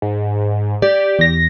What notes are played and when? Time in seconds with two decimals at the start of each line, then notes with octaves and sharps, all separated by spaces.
0.02 G#2
0.82 G4 D5
1.19 E2 A#6